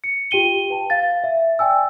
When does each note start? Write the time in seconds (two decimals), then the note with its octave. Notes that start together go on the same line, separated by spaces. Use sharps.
0.04 C#7
0.31 F4 G4 G5 D#7 G7
0.70 B4 G5 A5
0.90 F5 A6
1.24 E5
1.59 D5 G5 G#5 E6